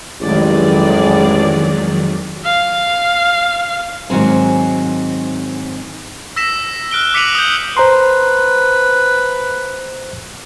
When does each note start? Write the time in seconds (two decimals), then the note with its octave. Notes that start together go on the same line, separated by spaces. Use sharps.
0.21 A1 F2 D#3 F#3 G#3 G#4 D5
2.45 F5
4.10 G#2 D#3 F#3 C4 G#5
6.36 E6 A#6 B6 E7
6.91 F6 F#6 D7 G7
7.14 D6 B6 C#7 D#7 F7 F#7
7.35 D#6 G6
7.77 B4 C5 A#5 C6